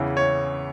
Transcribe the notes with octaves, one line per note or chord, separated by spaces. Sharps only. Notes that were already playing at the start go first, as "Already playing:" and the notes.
Already playing: E2 C#3 E3
C#5